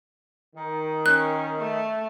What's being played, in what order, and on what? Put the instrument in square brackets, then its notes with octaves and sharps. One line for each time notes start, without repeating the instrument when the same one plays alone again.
[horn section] D#3
[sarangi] C#4 [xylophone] F#6
[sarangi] A3